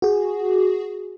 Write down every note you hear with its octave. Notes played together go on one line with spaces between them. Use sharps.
F#4 G#4